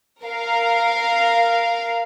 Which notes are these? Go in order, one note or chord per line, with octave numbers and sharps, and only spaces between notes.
A#4 F5